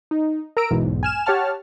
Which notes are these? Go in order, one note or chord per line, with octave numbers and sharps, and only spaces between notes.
D#4
A#4 A#5 E6 D7
B1 E2 G#2
G#5 F6 E7
G4 C#5 F#5 A5 F6